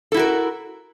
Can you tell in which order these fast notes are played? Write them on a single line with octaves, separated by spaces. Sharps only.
A4 E4 F#4 A#4